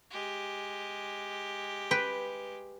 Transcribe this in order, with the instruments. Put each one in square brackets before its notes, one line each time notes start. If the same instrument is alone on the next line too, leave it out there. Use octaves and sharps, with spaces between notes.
[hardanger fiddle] G#3 G4
[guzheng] B4 G5